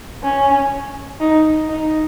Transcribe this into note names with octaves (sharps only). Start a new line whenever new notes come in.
C#4
D#4
D#4